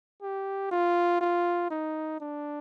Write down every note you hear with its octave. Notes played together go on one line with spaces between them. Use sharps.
G4
F4
F4
D#4
D4